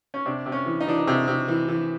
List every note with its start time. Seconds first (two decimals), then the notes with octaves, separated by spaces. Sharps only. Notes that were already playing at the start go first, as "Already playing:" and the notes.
0.14 C#4
0.26 C3 D4
0.46 C3
0.52 C#4
0.66 E3
0.80 D#4
0.87 E3 D4
0.98 D#4
1.07 C3 G#4
1.28 C3
1.48 E3
1.68 E3